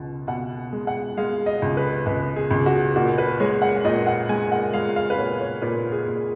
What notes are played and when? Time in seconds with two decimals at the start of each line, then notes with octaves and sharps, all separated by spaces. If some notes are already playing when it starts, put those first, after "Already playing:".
Already playing: C#2 B2
0.27 B2 F#5
0.73 G#3
0.87 F#5
1.17 G#3 F5
1.46 D#5
1.62 C#2
1.77 B4
2.06 C#2 B4
2.36 G#4
2.51 C#2
2.66 F#4
2.96 A#2 F#4
3.18 B4
3.40 G#3 C#5
3.62 F#5
3.85 A#2 D#5
4.07 F#5
4.29 G#3 G#5
4.52 F#5
4.73 G#3 F5
4.96 F5
5.10 B4
5.18 A#2 C#5
5.40 C#5
5.62 A#2 B4
5.92 G#4
6.08 A#2